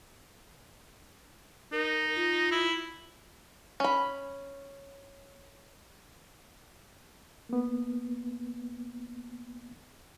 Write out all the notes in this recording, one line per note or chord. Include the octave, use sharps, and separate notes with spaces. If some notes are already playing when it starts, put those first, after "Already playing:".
D#4 A#4
F4
E4
C#4 B5
A#3 B3